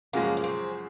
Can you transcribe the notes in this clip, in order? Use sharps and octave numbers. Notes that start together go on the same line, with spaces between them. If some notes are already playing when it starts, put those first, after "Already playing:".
F#2 C#3 F3 G#3 A#3
A#3
C4